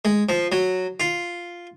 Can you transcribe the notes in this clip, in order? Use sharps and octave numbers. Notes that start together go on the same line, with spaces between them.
G#3
F3
F#3
F4